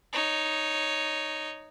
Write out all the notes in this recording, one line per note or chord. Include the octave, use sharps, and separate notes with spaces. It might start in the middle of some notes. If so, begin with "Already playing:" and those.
D#4 C#5